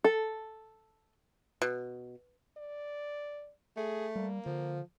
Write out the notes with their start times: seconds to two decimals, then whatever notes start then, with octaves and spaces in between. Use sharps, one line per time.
0.04 A4
1.62 B2
2.58 D5
3.77 A3 G#4
4.16 G3 A#3
4.46 D3 F3